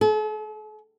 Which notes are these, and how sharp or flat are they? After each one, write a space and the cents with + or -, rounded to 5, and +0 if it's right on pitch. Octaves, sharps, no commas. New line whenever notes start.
A4 -45